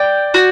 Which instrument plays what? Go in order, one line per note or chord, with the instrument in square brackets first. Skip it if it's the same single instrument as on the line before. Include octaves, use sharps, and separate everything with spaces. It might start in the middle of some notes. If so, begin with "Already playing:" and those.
Already playing: [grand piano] D5 [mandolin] G5
[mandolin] F#4